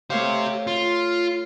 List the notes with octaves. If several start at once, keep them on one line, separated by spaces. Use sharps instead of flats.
A3 G4 C5 C#5 F5
F4